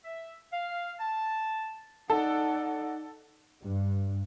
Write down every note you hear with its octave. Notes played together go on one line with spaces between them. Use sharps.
E5
F5
A5
D#4 A4 D5 F#5
G2